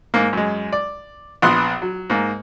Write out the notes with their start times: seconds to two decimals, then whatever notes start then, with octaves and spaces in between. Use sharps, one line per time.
0.14 G#2 A#3
0.33 F#2 G#3
0.72 D5
1.42 A#1 B3 C6 D#6 F#6
1.82 F#3
2.10 G#2 A#3